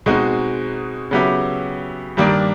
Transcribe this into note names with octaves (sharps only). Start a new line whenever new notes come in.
B2 G#3 C4 D#4 F#4
C#3 F#3 B3 E4 G4
G2 D#3 G3 A#3 D4